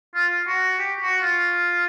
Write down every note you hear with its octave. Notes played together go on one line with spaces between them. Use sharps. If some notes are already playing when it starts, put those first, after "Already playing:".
F4
F#4
G4
F#4
F4